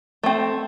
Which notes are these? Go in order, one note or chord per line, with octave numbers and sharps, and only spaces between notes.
A3 C4